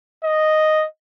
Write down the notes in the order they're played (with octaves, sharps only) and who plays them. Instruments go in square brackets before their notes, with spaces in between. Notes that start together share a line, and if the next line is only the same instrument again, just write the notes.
[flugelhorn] D#5